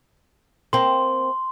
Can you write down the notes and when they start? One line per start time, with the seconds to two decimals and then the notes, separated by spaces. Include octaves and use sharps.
0.73 A#3 C4 C6